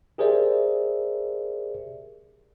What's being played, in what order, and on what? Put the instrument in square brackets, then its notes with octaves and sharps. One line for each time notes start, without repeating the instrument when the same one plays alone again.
[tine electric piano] G4 G#4 A#4 C5 D5 E5